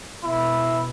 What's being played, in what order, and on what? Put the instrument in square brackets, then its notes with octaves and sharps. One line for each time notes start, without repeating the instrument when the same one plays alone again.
[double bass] B2 [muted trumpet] E4